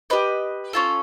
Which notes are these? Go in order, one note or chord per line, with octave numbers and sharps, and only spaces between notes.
G4 B4 D#5
C#4 F4 A4